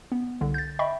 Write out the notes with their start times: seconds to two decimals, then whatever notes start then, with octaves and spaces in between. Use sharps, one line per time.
0.12 B3
0.41 C2 D3
0.54 G6 A6
0.79 D#5 E5 G5 B5 C#6